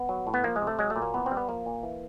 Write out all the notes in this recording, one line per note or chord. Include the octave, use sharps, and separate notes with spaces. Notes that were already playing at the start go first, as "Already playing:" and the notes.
Already playing: B3
F#3
A2
B3
F3 A#3
G#3
C3
A3
F#3 G#3
A3
A#2
A#3
E3 B3
C4
G3
B3
F3 A#3
A#2
E3